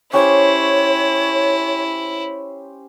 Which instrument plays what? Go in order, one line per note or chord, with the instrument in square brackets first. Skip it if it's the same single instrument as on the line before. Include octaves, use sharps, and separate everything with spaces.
[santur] C#4 G4 C5 [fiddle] E4 [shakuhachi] C#5